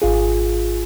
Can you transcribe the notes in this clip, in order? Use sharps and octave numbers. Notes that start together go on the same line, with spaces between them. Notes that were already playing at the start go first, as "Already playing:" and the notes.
G#1 F4 G#4